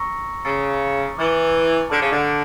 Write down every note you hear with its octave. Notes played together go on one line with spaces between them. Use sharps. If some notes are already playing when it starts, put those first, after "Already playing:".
Already playing: A#5 C#6 E6 A#6 C#7
C#3 A#5 C#6 E6 A6 C#7
E3 D6 F6 A6 C#7
D3 A5 D6 F6 C#7 E7
C#3
D3